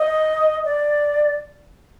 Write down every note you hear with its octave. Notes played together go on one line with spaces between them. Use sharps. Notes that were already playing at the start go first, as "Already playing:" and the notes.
Already playing: D#5
D5